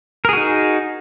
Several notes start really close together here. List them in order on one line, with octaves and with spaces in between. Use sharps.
A#4 G#4 F#4 D#4